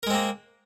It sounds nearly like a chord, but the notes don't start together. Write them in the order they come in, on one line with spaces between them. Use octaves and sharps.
A#4 G#3 C4 A#3